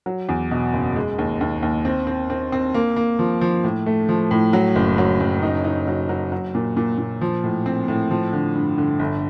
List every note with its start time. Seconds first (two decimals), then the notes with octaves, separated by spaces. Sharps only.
0.06 F#3
0.29 E2
0.51 B2
0.73 F#1
0.96 G#3
1.19 D#2
1.41 D#2
1.63 D#2
1.85 C4
2.07 C4
2.30 C4
2.52 C4
2.74 A#3
2.96 A#3
3.19 F3
3.41 F3
3.64 A2
3.86 A3
4.09 F3
4.31 A2
4.53 F#3
4.76 F#1
4.98 F#3
5.20 F#1
5.43 D#4
5.64 D#4
5.88 F#3
6.09 F#3
6.32 F#3
6.55 A#2
6.77 A#2
6.98 A#2
7.21 F3
7.44 A2
7.66 C4
7.88 A2
8.11 F3
8.33 D3
8.55 G2
8.78 D3
8.99 G1